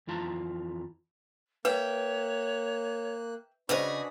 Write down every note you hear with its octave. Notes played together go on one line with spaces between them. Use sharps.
F2 E3 F4 A5 A#5
A#3 B4 C#5 E5 G5 F#6
C#3 D4 F#4 G#4 B4 C5 D#5 B5